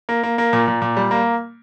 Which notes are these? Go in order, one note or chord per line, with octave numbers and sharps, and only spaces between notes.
A#3
A#3
A#3
A#2
A#2
A#2
G3
A#3